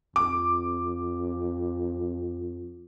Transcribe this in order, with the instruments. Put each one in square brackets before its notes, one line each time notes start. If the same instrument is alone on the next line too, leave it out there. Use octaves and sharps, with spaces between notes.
[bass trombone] F2 [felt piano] D6